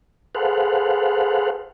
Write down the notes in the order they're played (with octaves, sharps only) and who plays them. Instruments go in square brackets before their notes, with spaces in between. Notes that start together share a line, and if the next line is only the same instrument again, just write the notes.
[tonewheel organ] G#4 A4 B4 C5 F5 F#5